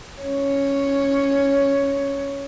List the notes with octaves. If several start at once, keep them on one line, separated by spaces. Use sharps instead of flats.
C#4 C#5